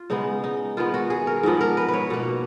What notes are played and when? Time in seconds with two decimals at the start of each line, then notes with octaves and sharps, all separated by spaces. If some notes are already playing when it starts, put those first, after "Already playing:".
Already playing: F4
0.10 C#3 G#3 B3 D#4
0.44 D#4
0.77 D#3 G#3 B3 F4
0.94 F#4
1.10 G#4
1.27 A#4
1.43 G#2 F3 B3
1.61 A#4
1.77 B4
1.88 B4
1.93 C#5
2.10 B2 A#3